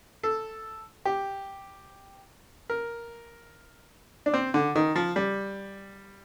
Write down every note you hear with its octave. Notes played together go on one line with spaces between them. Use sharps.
A4
G4
A#4
D4
C4
D3
D#3
F3
G3